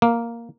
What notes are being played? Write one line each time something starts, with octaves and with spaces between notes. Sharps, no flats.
A#3